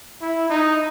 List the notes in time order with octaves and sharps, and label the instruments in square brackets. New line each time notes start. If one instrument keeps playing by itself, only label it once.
[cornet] E4
D#4